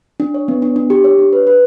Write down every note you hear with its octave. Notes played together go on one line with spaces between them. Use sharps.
D4
C#5
B3
D4
D4
G4
C#5
D4
B4
B4